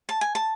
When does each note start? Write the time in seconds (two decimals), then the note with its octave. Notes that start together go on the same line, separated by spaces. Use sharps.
0.09 A5
0.21 G#5
0.35 A5